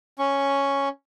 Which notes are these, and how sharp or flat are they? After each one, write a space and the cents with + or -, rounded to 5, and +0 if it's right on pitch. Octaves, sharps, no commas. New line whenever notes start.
C#4 +0 C#6 +0